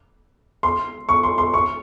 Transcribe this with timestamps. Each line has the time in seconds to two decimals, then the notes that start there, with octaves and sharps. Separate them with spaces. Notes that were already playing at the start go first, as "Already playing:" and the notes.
0.63 C6
1.09 C#6
1.23 C6
1.38 C6
1.54 C#6